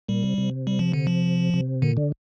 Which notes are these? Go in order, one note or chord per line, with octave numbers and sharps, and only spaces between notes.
A#2 G3
C3
C3
G3
F3
D3
F3
C3
A#2 D3
D3